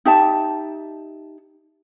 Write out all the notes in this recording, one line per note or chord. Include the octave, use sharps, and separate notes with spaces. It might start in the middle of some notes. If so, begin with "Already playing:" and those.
D#4 G4 E5 A5